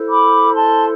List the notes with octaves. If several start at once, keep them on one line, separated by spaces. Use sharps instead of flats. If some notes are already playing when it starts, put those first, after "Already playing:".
Already playing: E4 A4 C5
B5 D6
A5 C6